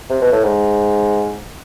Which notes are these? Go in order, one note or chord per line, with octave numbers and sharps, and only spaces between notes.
C3
B2
A2
G#2